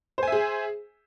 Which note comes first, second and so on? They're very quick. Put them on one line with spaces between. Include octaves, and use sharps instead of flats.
C5 G#5 E5 G#4